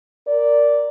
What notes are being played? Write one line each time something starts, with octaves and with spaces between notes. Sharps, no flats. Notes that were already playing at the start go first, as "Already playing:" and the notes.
A#4 D5